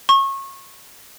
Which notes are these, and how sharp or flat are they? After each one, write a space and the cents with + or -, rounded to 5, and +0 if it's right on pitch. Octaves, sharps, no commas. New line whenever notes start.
C#6 -25